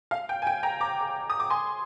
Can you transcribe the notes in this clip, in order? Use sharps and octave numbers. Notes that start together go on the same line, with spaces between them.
F5
G5
G#5
G5
G5 A#5
A#5 D6
D#6
D6
G#5 C6